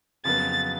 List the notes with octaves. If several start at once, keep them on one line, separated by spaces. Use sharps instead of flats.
F2 C#3 F#3 B3 A6